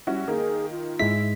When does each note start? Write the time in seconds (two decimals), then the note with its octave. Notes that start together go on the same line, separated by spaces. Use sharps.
0.07 G3 C#4 E4 F#4
0.28 D#3 A#3 G#4
0.71 F4
0.99 G#2 G#3 E4 B6